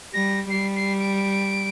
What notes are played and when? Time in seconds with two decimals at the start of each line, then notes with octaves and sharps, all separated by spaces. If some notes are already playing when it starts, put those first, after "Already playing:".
0.13 G3 A#6
0.50 G3 C7
0.76 C7
1.00 D7